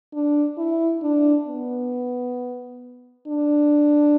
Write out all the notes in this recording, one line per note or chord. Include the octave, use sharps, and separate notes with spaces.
D4
E4
D4
B3
D4